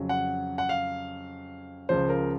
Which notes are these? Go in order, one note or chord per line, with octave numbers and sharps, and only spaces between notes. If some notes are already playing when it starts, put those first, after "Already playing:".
Already playing: F2 C#3 F#3
F#5
F#5
F5
C#2 C#3 F3 C5
A#4